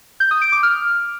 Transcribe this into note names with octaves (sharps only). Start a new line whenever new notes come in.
G6
D#6
D7
D6
F6